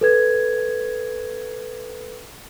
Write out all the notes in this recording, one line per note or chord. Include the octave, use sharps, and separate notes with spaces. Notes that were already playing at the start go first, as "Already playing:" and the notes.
A4 B4 G#6